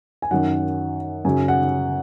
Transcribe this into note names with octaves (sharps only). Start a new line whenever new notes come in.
G#5
F#2 D#3 F#3 F#5
F#2 C#3 F#3 G#5
F#5